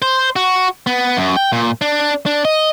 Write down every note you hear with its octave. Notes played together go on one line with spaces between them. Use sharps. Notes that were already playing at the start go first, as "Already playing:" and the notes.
C5
F#4
B3
F#2
G5
A#2
D4
D4
D#5